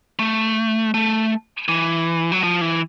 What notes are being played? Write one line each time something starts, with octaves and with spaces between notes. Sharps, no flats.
A3
A3
E3
F#3
F3
E3